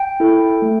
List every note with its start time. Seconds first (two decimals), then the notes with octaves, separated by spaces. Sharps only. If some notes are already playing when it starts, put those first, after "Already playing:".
Already playing: G5
0.20 E4 A4
0.62 A3